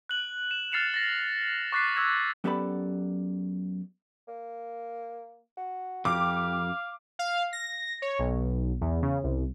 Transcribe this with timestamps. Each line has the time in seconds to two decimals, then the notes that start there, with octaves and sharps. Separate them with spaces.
0.09 F#6 F#7
0.51 E7
0.72 F6 A6 C7 C#7 E7 F7
0.94 A6 A#6
1.72 C#6 D6 F#6 A6 B6 C7
1.95 C#6 E6 G#6 C7 E7
2.44 F#2 B3 G4 A4 D5 B5
4.28 A#3
5.57 F#4
6.05 F2 G4 F5 D6
7.19 F5
7.53 A#6
8.02 C#5
8.19 B1
8.81 E2
9.02 C#3
9.24 C2